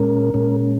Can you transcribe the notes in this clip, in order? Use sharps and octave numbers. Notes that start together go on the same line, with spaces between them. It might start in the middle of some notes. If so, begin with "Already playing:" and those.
Already playing: A#2 G#3 C#4 A#4
A#2 G#3 C#4